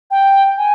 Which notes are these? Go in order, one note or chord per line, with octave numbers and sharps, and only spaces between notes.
G5
G#5